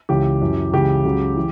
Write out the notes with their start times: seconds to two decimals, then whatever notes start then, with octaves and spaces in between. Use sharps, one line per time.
0.09 C#2 C#3 E3 G4
0.42 F#2 E3
0.72 C#2 C#3 E3 G4
1.05 C#2 C#3 F#3
1.36 E3